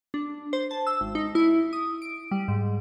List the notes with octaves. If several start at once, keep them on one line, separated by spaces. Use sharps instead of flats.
D4
C5
A5
E6
G#1
D#4
E4
D#6
D7
G3
G#2